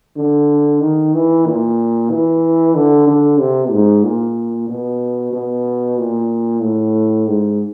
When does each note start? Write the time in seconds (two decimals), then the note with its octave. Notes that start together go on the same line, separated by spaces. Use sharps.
0.16 D3
0.81 D#3
1.14 E3
1.46 A#2
2.10 E3
2.75 D3
3.07 D3
3.39 C3
3.72 G#2
4.04 A#2
4.69 B2
5.33 B2
5.98 A#2
6.62 A2
7.27 G#2